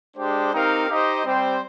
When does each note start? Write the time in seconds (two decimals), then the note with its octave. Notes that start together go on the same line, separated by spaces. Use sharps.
0.17 G#3 D4 G4 C5
0.53 C4 D#4 G4 A#4 F5
0.88 D#4 G4 C5 D#5
1.24 G3 C4 G4 C5